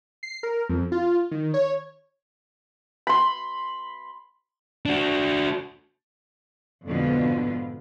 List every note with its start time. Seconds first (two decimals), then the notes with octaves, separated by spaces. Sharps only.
0.23 C7
0.43 A#4
0.69 F2
0.92 F4
1.31 D#3
1.54 C#5
3.07 B5 C6
4.86 D4 F#4
6.85 F2 G#2 B2 D3 B3 F4